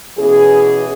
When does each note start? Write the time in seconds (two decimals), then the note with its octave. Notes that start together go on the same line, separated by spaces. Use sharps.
0.18 B2 E3 C#4 G#4